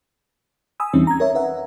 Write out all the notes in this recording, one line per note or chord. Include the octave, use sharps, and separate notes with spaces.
G#5 B5 D#6 E6
E2 E3 G3 C4 C#4 D#4
A#5 G#6
A#4 C#5 E5
B4 E5 F#5